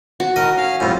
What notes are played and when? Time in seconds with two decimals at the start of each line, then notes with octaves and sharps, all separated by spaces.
0.20 F#4
0.36 A2 D#3 A#4 D#5
0.57 C#4 F5 F6
0.80 F2 A2 G3 C#4 F4